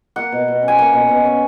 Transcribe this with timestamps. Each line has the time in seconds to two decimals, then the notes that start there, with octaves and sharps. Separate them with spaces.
0.16 A#3 F#5
0.32 B2
0.48 B2
0.63 C#4
0.68 G#5
0.79 A#3 F#5
0.93 B2
1.09 B2
1.25 C#4